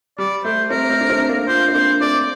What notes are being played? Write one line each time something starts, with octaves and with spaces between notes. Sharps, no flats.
G3 D5
A3 C5
A3 C4 A#4
A3 C4
D4
A3 C4
A#3 D4
D4 F4 C5
C4
A#3 D4 C5
A3 C4 D5